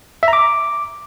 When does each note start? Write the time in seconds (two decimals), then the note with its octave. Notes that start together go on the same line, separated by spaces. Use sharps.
0.23 E5
0.28 A#5
0.33 D6